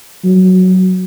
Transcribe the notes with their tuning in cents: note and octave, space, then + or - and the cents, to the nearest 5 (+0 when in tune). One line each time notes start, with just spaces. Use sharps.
F#3 +0